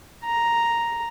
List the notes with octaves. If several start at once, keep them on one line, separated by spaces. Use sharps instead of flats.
A#5